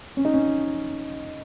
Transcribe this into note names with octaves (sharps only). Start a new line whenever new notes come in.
C#4
D#4
C#4